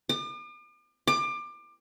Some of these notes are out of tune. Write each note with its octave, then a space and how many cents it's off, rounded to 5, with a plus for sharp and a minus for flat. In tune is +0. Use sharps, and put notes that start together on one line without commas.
D6 +45
D6 +25